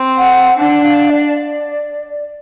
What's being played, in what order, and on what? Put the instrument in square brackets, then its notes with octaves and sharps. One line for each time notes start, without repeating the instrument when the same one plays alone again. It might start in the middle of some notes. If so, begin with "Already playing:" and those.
Already playing: [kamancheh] C4
[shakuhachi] F#5
[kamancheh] D4 [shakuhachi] F#5
[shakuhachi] F5
D5